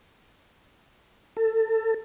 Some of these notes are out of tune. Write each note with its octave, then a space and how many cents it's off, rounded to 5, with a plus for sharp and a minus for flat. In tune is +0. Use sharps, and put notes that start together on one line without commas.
A4 +25